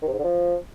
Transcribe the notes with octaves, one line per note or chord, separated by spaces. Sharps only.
D#3
C3
G#2
D3
F3